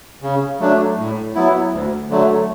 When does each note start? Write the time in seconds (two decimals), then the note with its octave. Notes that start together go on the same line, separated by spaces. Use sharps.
0.22 C#3
0.60 F#3 A3 D4
0.98 A2
1.35 F#3 B3 E4
1.72 D2
2.10 D3 F#3 A3